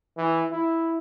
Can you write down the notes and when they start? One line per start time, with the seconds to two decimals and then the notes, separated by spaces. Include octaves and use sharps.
0.17 E3
0.51 E4